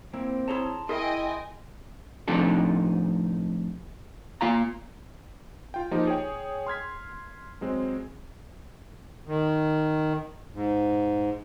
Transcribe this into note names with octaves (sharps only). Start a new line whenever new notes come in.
A#3 C4 E4
E4 G#4 C#5 A5 A#5 C6
E4 G#4 A#4 D#5 E5 G5 G#5 C6
A2 C3 F3 D4 D#4 A4
A#3 F4 F5 A#5
F4 G5
F3 A#3 D#4 G4
G#4 C#5 G5
C6 F6 G#6 B6
F#3 G#3 C4
D#3
G#2